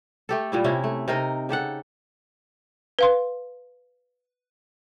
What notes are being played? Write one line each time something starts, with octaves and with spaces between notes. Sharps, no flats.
A3 G4 A4
A#2 G3 E4
C3 C#4 E4
A3
C3 D#4 A#4 D#5
C#3 G4 A4 F#5
B4 F5 C6